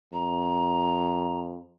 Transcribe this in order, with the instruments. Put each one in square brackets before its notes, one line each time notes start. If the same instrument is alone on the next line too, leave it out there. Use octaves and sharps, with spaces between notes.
[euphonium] F2 [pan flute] A#5